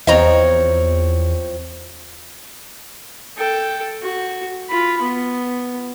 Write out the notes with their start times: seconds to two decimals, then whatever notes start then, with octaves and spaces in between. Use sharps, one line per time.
0.07 E2 F3 C4 C#5 D#5 A#5
3.37 A4 G5
4.02 F#4
4.70 F4 B5
5.01 B3